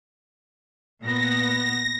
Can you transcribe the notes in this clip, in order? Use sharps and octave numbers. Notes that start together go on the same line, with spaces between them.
A#2 B3 A#6